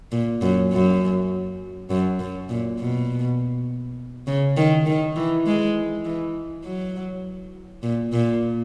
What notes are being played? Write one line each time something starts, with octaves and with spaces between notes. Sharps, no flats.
A#2
F#2
F#2
F#2
F#2
A#2
B2
C#3
D#3
D#3
E3
G#3
E3
F#3
A#2
A#2